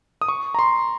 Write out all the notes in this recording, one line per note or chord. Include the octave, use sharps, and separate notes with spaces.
D#6
C#6
A#5
C6